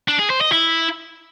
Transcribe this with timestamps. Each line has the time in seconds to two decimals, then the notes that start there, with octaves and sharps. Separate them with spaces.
0.08 D4
0.19 G#4
0.30 C5
0.41 D#5
0.52 E4